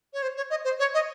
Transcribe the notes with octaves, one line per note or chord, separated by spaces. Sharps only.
C#5
C5
C#5
D#5
C5
C#5
D#5